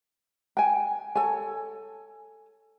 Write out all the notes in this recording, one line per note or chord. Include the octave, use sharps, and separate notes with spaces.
G5 G#5
A4 C#5 G#5